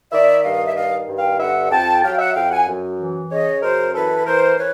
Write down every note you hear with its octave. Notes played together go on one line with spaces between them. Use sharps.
D#3 D5 E5
G2 D#5 F5
E5
D#3 D#5 F5
G2
F5 G5
D3 E5 F#5
F2 G5 A5
F#3 F5 G5
E5 F#5
F2 F5 G5
F#5 G#5
F#2
E3
C#3 C#5 D#5
F#2 A#4 C5
E3 A4 B4
E3 A#4 C5
E3 B4 C#5